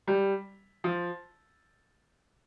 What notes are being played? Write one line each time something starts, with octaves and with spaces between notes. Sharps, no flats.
G3
F3